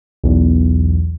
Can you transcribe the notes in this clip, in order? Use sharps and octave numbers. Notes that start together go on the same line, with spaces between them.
B1 E2